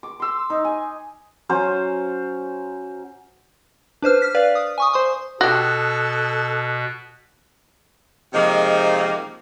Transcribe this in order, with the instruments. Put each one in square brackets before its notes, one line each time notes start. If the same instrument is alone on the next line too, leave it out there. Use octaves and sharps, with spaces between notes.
[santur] D6
C6 E6
D#4
G#5
F#3 C#4 C5
[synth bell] D4 B4 C5 F6
F6 B6
B4 D5 F5
D#6
G#5 C#6 D#6
C5 C6 D#6
[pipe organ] B2 [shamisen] F#4 G4 [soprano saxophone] A4 [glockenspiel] D#6 F#6
[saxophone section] C3 D#3 F3 G#3 A#3